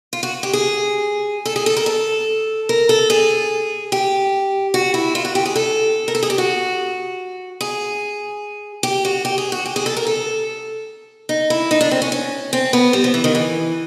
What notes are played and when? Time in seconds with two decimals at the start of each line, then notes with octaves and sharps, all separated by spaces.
0.13 F4
0.23 F#4
0.43 G4
0.53 G#4
1.45 A4
1.56 G#4
1.66 A4
1.77 A#4
1.86 A4
2.69 A#4
2.89 A4
3.10 G#4
3.92 G4
4.74 F#4
4.94 E4
5.15 F4
5.25 F#4
5.35 G4
5.46 G#4
5.56 A4
6.08 A#4
6.15 A4
6.23 G#4
6.30 G4
6.38 F#4
7.61 G#4
8.83 G4
9.05 F#4
9.25 G4
9.38 G#4
9.52 F#4
9.66 G4
9.76 G#4
9.86 A4
9.97 A#4
10.07 A4
11.29 D#4
11.50 E4
11.71 D#4
11.81 D4
11.91 C4
12.02 C#4
12.12 C#4
12.53 C4
12.73 B3
12.93 G3
13.04 F3
13.14 E3
13.24 D#3
13.35 E3